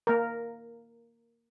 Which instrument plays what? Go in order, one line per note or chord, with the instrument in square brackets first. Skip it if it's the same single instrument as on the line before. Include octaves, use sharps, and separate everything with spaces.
[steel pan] A#3 A#4